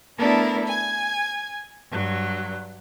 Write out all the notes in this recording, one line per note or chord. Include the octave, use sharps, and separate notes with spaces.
A3 B3 D4 E4 A4 A#4
G#5 G#6
G2 F#3